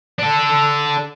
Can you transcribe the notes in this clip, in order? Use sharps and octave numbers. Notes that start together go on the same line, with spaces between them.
D4 A4